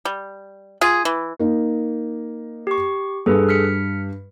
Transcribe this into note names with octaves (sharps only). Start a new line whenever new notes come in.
G3
F4 G#4
E3
A#3 D#4
G4 C#6
G2 G#4 A4 B4
F6 B6 C#7